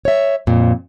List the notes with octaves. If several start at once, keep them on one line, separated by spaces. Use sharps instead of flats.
C#5 E5
F2 A#2